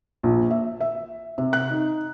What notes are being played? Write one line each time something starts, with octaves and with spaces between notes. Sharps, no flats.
A#1
E5
E5
C3
F#6
D#4